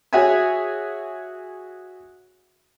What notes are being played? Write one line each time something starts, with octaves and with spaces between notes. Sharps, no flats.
F#4 G#4 C#5 E5 G#5